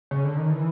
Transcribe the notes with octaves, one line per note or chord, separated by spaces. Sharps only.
C#3
D3
D#3
E3